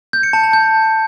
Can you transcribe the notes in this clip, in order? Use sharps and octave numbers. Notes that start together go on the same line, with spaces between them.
G6
C#7
A5
A5
G6